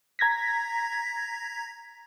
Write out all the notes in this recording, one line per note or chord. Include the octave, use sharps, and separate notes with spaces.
A#5 G#6 A#6 B6